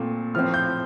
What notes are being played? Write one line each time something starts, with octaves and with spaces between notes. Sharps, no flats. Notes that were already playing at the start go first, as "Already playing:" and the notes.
Already playing: A#2 A3 C4
A2 F3 C4 F6
G6